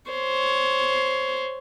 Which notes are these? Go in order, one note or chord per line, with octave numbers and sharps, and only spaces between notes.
C5 C#5